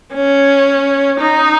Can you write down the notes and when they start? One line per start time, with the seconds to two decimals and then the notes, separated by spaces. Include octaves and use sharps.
0.14 C#4
1.20 D#4